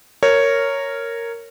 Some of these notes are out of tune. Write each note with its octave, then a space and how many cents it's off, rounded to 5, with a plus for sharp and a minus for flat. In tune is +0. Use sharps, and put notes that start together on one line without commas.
A#4 -10 C#5 +0